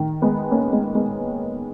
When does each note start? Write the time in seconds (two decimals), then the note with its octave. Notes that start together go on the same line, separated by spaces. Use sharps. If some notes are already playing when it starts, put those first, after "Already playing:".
Already playing: D#3
0.22 G#3 B3
0.51 A#3 C#4
0.72 G#3 B3
0.95 G#3 B3